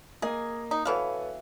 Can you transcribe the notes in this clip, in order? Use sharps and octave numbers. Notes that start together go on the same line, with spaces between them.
A#3 G#4 D#5
D#4
B2 E3 A4 B4 C#5 F5